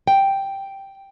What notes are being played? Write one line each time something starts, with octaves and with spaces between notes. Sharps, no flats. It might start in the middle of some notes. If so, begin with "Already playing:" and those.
G5